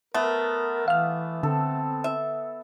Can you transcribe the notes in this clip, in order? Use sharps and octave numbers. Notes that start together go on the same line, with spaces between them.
A3 B3 A#4
E3 F5 F6
D3 C4 A4
E5